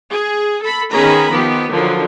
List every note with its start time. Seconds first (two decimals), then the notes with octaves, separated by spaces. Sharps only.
0.10 G#4
0.62 A4 B5
0.92 D#3 B3 C#4 G#4 A#5 B5
1.30 D#3 F3 B3 G4
1.71 D3 D#3 F3 F#3